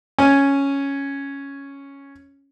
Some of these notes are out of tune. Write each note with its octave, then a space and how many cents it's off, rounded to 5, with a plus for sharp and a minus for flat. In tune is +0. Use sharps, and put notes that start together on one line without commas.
C#4 +0 G#5 +0